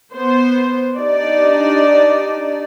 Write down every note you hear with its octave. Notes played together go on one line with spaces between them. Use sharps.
B3 C5
D4 D#4 G4 D5